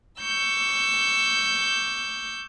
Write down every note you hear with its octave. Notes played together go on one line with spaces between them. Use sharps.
C#6 D6 E6 G6